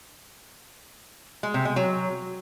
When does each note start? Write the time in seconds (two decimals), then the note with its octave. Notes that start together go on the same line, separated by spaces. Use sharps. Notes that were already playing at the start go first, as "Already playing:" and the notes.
1.43 G#3
1.54 C3
1.65 G#3
1.76 F#3